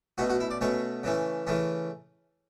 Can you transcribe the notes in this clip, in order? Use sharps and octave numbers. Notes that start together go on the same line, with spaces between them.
B2 A3 C#4 F#4
F#4
E4
D5
B2 A3 C#4 C#5
C#3 E3 A3 C#4
C#3 E3 A3 C#4